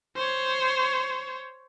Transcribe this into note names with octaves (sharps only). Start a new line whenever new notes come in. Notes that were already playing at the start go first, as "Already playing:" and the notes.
C5 C#5